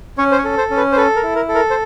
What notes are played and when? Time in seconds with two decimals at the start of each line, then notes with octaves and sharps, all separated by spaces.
0.18 C#4 C#5
0.32 C5
0.38 C#5
0.44 A4
0.58 C5
0.70 C#4
0.77 B4
0.92 C5
0.96 A4 B4
1.16 A#4
1.23 E4
1.36 A#4
1.49 A4
1.55 A#4
1.70 C5